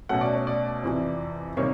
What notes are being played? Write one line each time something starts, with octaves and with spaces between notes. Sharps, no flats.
B2 F#3 A3 C#4 F#5
D5
C#5
D5
F2 C3 E3
C3 D#3 G3 A#3 C#5